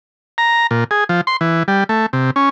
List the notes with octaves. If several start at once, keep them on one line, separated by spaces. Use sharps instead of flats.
A#5
A#2
G#4
F3
C6
E3
G3
A3
C3
C#4